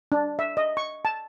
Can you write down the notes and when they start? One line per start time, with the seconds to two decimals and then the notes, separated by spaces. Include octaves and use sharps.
0.12 D4
0.39 E5
0.57 D#5
0.77 C#6
1.05 A5